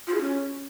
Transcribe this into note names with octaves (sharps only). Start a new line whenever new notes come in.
F4
G#4
C#4